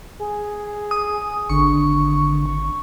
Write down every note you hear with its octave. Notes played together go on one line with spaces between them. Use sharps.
G#4
D#6
G#1 D3 C#6
C#6